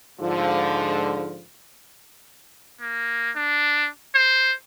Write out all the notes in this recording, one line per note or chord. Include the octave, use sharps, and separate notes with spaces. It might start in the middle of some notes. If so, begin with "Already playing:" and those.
G#2 D3 F3
A#3
D4
C5